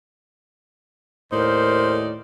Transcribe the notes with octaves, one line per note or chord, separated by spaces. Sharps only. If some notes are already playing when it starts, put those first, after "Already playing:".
D#2 A2 D#4 A#4 C5 D5